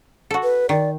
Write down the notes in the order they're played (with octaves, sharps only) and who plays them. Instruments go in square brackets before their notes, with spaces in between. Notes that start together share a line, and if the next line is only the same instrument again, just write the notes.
[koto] F#4 A4
[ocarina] B4
[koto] D#3 [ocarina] D5